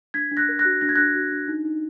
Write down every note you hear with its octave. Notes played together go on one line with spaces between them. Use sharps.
D4 G#6 B6
D4
F#6 A#6
A#4
F#6 A#6
F#4
D4 A#6
G#6
D4 F#6 A#6
F#4
D4
D#4
D#4